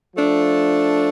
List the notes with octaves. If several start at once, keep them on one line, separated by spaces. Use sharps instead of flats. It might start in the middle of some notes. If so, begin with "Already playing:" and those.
F3 A3 D4